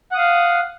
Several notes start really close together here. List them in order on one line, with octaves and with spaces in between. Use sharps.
F#5 D#6 F5